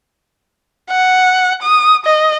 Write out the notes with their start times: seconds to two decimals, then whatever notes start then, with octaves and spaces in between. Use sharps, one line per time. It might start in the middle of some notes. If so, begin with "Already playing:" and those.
0.90 F#5
1.62 D#6
2.05 D#5